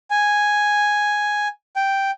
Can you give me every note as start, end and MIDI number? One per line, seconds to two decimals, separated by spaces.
0.11 1.48 80
1.76 2.11 79